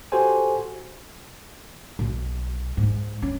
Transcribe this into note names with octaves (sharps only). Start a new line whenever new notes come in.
F#4 G4 A4 C5 G#5
B1
G#2
C#4